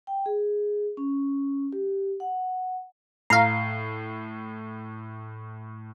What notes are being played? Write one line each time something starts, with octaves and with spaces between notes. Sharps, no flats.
G5
G#4
C#4
G4
F#5
A2 F5 A#5 C7